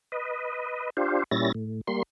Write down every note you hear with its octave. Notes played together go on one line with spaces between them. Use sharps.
B4 D#5
D4 F4 G4 C5
A#2 G3 C#4 E4 A6 A#6
A2
G3 A#3 C6